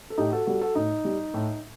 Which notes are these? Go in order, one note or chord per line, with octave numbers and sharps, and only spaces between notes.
A4
A2 D#4 G4
F#4 A4
G3 F#4 A4
F#4 A4
A2 D#4
G3
A2